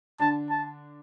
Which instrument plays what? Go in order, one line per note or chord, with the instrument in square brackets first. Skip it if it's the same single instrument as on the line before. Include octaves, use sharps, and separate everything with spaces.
[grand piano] D3 D4 [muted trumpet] A5
[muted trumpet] A5